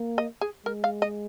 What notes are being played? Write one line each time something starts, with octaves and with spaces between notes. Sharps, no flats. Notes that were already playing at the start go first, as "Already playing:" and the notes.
Already playing: A#3
D#5
G#4
G#3 A#4
F5
D#5